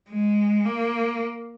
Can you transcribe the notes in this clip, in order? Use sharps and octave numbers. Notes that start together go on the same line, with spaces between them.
G#3
A#3